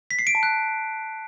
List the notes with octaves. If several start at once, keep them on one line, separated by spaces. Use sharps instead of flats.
B6
C7
D7
A5
F#6